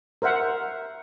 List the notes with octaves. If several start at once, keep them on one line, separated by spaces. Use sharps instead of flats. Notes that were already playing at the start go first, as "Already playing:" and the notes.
A#4 C5 E5 F#5